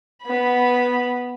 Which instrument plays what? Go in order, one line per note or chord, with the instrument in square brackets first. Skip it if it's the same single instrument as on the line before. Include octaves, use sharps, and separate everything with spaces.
[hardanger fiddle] B3 B5